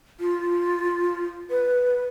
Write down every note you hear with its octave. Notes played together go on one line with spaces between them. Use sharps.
F4
B4